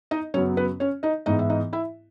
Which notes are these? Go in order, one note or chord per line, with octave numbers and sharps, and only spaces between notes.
D#4 D#5
F#2 C#3 F#3 B3 C#4 C#5
B3 B4
C#4 C#5
D#4 D#5
G#2 E3 B3 D#4 D#5
E5
D#4 D#5
E4 E5